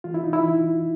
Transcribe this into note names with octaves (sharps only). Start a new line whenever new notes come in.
E3 F4
E4
D#4
E4
E3